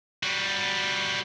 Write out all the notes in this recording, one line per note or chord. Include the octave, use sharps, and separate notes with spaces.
G3 F#4